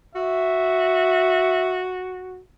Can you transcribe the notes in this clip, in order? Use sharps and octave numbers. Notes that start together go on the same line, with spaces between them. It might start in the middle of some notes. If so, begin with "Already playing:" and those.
F#4 E5